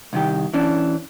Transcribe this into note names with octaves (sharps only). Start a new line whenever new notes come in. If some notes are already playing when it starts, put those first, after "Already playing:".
C2 D#3 G4
E3 C#4 D4